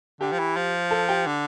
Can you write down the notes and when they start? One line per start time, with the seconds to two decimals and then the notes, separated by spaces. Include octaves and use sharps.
0.21 D3 G4 G5
0.32 F3
0.39 E3
0.56 F3
0.91 A4 A5
1.09 G4 G5
1.26 D3